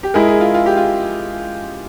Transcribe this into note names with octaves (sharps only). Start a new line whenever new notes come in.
G4
G#3 E4 G#4 A#4
G#4
F4
F4
G4
F4